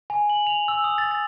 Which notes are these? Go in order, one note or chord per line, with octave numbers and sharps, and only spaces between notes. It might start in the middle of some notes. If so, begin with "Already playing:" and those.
G#5
F#7
F7
E6
D#6
A6
A6